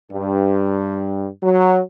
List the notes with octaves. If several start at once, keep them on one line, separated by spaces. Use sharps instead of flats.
G2
F#3